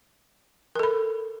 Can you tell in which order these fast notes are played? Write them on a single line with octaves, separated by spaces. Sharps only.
A#4 A4 B5